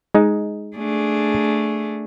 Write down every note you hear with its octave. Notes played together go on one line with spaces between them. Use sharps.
G#3 D#4
A3 D4 G#4